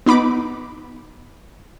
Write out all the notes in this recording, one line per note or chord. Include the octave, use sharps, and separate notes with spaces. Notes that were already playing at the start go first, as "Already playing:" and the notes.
B3 D#4 B5 D6 D7